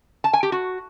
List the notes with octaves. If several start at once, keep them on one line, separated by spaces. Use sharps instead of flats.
A5
G#5
G4
F#4